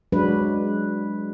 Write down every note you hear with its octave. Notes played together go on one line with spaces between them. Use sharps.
F#3 G#3 D4 B4